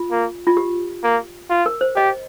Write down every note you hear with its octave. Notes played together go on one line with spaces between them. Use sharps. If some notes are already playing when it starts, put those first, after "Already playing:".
Already playing: F4
A#3
F4
G4
A#3
F4
A#4
C5
G4 D#5